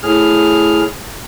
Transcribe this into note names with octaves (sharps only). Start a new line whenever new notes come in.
A2 G#4 F6